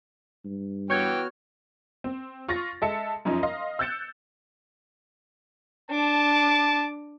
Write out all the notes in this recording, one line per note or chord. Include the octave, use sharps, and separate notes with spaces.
G2
E3 B3 F#4 C#5 G5 F6 G6 G#6
C4
F4 C#6 A6 A#6
G#3 A4 E5 A5 C#7
F#2 F3 C#4 D#4
D#5 F5 C6
E6 F#6 G6 A6 C#7 E7
D4 A5 D6